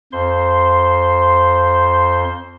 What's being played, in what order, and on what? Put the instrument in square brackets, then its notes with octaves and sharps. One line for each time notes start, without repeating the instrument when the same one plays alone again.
[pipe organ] F2 C5 C6